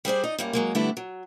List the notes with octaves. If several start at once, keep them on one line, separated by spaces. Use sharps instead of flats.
G3 G#4 C5 D5
D#4 D5 D#5
F#2 G3 A#3
F#3 G#3 A#3
D3 G3 A3 B3 D4 E4
F#3